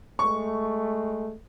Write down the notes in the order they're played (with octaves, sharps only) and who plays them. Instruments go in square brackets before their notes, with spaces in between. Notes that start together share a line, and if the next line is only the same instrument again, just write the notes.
[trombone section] G#3 A3 [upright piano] C#6